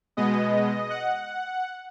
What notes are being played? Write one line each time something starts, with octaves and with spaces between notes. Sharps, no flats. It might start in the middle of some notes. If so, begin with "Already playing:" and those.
B2 G#3 B3 D#5
F#5